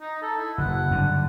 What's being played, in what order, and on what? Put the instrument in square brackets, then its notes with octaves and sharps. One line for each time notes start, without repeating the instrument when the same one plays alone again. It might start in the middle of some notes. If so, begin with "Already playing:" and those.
[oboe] D#4
A4
E4
[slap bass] F#1 [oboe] F#5
[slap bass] G2 D3